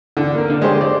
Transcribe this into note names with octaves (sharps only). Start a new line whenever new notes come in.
D3
A#3 A#4
D3
G#3 G4 C5
D5